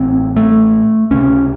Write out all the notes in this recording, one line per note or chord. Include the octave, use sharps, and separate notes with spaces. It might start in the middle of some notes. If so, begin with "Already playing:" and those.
Already playing: A1 A2 C4
A3
C#2 C3 C#4